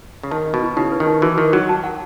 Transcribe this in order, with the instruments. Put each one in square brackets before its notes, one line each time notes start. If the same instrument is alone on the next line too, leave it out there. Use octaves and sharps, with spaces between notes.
[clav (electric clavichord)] C#3
[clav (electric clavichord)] D#3 [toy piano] A5
[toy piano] D#5
[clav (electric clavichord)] B2
[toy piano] E4
[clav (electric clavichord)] C#3 [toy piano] D#4
[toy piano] B4
[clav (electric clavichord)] D#3
[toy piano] D#4
[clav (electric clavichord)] E3 [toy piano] F#4
[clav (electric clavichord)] D#3 [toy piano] D#5
[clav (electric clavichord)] F#3 [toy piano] F#4
[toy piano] A5
F#5